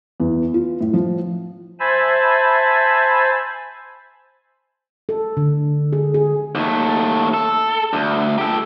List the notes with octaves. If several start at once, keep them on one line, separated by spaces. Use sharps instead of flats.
E2
F4
A2
F3
C5 E5 G#5 A5 B5
A4
D3
G#4
G#4
D#2 A3
A4
D2
G4 A4